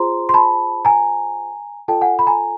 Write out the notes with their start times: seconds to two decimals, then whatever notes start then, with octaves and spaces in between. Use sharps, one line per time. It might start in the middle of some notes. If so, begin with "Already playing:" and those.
Already playing: F4 G#4 C5 A#5 C6
0.29 C6
0.34 A5 B5
0.85 G#5 A#5
1.88 F4 A4 D5 G5 A5
2.01 F#5 G#5
2.19 B5
2.27 G#5 A#5